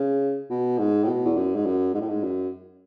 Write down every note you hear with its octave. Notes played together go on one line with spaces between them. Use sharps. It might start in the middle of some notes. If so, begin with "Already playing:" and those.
Already playing: C#3
B2
G#2
A2
B2
E2
F#2
G#2
F#2
G#2
A2
G#2
F#2